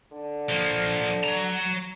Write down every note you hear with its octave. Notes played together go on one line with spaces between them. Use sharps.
D3
F3 A#3
F#3 A#5